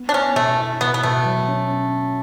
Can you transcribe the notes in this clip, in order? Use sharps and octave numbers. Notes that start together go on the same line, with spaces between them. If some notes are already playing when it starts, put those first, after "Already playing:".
Already playing: B3
D4
B3 C#4
B2 A3
E4
B2 B3
B3
B2 A3
F#3
C#4
C#4